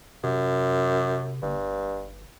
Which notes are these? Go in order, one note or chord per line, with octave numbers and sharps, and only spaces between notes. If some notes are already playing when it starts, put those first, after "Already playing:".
F#2 C3
G1 G2